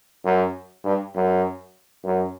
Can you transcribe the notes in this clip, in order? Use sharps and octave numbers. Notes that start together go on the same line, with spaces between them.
F#2
G2
F#2
F#2